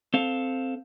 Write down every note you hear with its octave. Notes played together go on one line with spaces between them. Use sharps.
C4 A4 F5